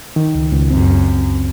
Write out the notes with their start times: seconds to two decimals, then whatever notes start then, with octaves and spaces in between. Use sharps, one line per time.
0.16 D#3
0.35 C#2
0.52 C#2
0.70 F#2 C4